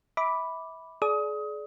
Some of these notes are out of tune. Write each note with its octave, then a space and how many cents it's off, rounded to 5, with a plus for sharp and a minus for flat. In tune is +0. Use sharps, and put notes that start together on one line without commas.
E5 -25 B5 +0 D6 +0
G#4 +35 D5 -5 D#6 +25